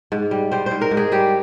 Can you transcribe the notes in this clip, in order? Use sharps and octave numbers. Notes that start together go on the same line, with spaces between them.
G#2
G3
G3 C5
C5
G#2
A#4
G#2
G#4
G3 G4